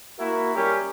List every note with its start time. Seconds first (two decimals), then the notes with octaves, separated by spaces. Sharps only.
0.19 A#3 E4 F#4 A#4
0.55 G3 C#4 G4 A#4